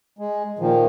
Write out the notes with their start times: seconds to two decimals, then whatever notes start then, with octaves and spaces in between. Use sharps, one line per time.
0.19 G#3
0.59 A#2 D#3 F3